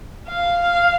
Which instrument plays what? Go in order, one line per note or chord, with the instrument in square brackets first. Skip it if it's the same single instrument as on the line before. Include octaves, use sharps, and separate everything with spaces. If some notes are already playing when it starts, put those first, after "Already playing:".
[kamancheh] F5